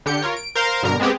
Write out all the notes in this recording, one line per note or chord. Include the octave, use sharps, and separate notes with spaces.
D3 G4 G6 C#7
F4 A#4 C#5
D7
A#4 C5 F5 A#5 C6
G2 B2 D3 A#4 A#5
G#3 B3 C4 G4 G#4